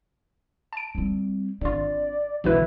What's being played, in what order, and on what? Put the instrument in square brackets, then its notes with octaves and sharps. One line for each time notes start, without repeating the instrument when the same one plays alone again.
[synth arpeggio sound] A5 D7
[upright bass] G3 C4
[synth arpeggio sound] G#1 F4 [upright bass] C4 D4 [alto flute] D5
[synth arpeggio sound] B1 B2 B4 [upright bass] D3 E3 [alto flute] E4